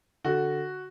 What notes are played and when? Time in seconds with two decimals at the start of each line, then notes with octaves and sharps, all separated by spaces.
0.24 D3 F#4